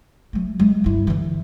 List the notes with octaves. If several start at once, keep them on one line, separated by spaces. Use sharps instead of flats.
F#3 A3
F#3 G#3
G1 E4
D3 E3